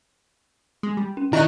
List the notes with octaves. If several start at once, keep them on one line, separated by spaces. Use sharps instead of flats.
G#3
G3
C#4
D#3 E4 D5 D#5 A#5 C#6 F#6